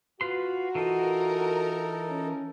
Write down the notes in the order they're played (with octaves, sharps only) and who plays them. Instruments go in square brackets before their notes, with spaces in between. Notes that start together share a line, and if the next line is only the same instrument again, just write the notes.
[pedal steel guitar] F4 B4 C6 [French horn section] F#4
[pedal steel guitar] E3 F4 [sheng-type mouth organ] D#4 A4 [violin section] A#4
[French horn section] C#4